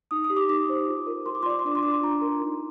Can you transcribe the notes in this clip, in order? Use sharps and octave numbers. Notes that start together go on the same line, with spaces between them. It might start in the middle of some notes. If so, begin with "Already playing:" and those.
D#4 D#6
D#6
G4
D6
D#4 D6
C5
F4
A#4
F4 C6
D6
C6
D5 D6
C6
D4 D6
C6
F4 D6
C6
D4 A#5
A#4
D#4